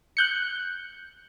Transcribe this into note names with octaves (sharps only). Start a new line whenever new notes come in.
F#6 G6 C#7